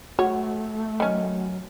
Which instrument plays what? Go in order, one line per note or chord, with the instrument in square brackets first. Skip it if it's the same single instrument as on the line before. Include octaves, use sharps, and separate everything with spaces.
[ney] A3 [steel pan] F#4 [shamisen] C#5
[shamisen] D#3 C#4 [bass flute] F#3